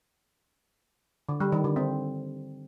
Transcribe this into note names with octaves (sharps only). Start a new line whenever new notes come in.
D3
G3
D#3
D3
C4